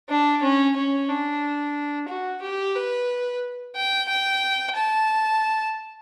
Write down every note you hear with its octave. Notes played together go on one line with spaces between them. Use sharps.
D4
C#4
C#4
D4
F#4
G4
B4
G5
G5
A5